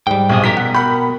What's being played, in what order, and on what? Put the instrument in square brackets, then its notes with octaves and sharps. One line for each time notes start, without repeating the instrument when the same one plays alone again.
[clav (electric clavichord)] G#2 G3 [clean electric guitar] G5
[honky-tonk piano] B1 [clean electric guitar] F#2 C4 G#4
[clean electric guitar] F3 G4 A#4 [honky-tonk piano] B6
[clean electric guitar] B2 [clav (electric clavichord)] F#5
[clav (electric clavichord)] A#4 F#5 G5 [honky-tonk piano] B5